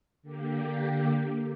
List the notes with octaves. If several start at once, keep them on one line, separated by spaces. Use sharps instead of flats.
D3 A#3 G4